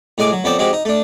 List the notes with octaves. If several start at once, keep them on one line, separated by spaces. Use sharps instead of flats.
A2 G#3 G#5 D6
F#3
F2 B3 C#5 D5 G5 A5
G#3 C4 F#4 G4
D#4
A3 D4